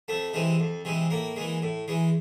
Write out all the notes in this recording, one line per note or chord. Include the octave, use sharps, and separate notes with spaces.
F2 A3
C3 E3 G#3
F2
C3 E3 G#3
A2 A#3
E3 G#3
A2
E3 G#3